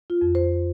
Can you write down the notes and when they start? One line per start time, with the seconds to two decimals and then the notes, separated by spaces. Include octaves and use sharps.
0.10 F4
0.21 F2
0.35 C5